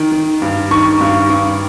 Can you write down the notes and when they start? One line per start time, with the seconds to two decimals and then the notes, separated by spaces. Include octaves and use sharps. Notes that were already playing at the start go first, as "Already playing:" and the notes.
Already playing: D#3
0.12 D#3
0.42 G2
0.71 D#3 C#6
1.01 G2
1.30 G2